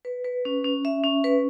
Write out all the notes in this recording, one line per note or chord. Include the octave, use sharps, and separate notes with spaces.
B4
B4
C#4
C#4
E5
C#4
B4